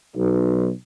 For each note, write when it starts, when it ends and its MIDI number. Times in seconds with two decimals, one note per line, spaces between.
0.16 0.67 35